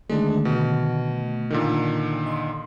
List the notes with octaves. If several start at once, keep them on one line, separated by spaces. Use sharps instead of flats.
D3 D#3 G#3 A3 D4
B2
A#2 D3 D#3
D#5 C6